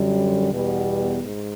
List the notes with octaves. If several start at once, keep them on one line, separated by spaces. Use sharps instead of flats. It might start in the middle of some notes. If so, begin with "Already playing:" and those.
Already playing: F#2 D3 G3
E2 B2 G3 B3
G#2